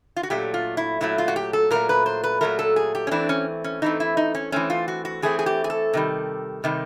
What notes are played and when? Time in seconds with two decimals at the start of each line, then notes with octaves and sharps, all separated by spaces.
0.16 F4
0.23 F#4
0.30 A#2 F#3 A3 G4
0.54 F4
0.77 E4
1.01 A#2 F#3 A3 E4
1.18 F4
1.28 F#4
1.36 G4
1.53 A4
1.70 A#2 F#3 A3 A#4
1.89 B4
2.06 C5
2.24 B4
2.41 A#2 F#3 A3 A#4
2.59 A4
2.76 G#4
2.95 G4
3.07 C#4
3.11 E3 A3 C4 D4
3.29 C#4
3.64 C#4
3.82 E3 A3 C4 D#4
4.00 E4
4.17 D#4
4.35 C#4
4.52 E3 A3 C4 C#4
4.70 F4
4.88 F#4
5.05 F#4
5.22 E3 A3 C4 G#4
5.39 G#4
5.46 G4
5.64 G#4
5.70 A4
5.93 C3 D#3 G3
6.64 C3 D#3 G3